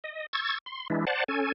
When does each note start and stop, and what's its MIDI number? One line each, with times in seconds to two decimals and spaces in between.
0.04 0.26 75
0.33 0.58 85
0.33 0.58 88
0.33 0.58 92
0.33 0.58 93
0.66 0.87 84
0.90 1.05 52
0.90 1.05 56
0.90 1.05 62
0.90 1.05 64
1.07 1.24 72
1.07 1.24 74
1.07 1.24 78
1.07 1.24 81
1.28 1.52 61
1.28 1.52 69
1.28 1.52 80